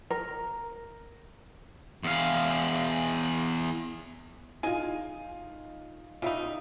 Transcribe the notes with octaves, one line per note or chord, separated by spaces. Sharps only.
A#4
E2 F5
D#4 F4 G#4 D#5 G#5
C#3 G3 D#4 F4 E5